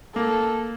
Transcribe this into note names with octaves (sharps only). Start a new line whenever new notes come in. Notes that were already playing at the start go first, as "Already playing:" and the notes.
A#3 A4